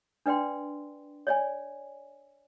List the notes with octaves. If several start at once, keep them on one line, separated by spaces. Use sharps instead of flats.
D4 B4 D5 G5 C6
C#5 D5 G#5